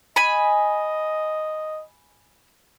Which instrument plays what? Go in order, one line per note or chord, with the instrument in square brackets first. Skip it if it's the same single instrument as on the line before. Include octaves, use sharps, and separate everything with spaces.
[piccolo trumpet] D#5 [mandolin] G#5 B5